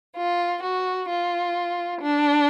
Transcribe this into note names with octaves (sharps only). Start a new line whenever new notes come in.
F4
F#4
F4
D4